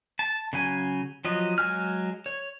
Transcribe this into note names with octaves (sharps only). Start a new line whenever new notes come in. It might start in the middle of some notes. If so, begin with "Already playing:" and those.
A5
C#3 F#3 G#5
F3 F#3 D#5
F#3 G#3 G#5 F6
C#5